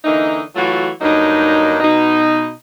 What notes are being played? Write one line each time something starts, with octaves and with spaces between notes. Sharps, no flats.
D3 E3 A#3 D#4
E3 F#3 A3 F4 F#4
G2 F#3 A#3 D#4
B2 D#4